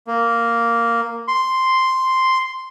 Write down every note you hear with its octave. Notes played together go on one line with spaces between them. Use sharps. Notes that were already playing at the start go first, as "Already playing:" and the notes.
A#3
C6